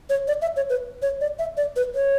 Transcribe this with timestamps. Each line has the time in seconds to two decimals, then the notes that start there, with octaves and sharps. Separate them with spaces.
0.10 C#5
0.28 D5
0.42 E5
0.56 C#5
0.70 B4
1.02 C#5
1.21 D5
1.39 E5
1.57 D5
1.76 B4
1.95 C#5